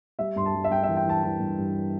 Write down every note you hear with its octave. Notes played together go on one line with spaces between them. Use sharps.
G3 E5
G2 C6
A5
G3
E5
G3 G5
E5
E3
G5
E3 A5
E3 A5
G2
G2